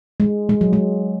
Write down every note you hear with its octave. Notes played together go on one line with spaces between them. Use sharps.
G#3
G#3
F#3
G#3